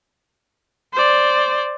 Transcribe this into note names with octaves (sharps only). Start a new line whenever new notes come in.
C5 D5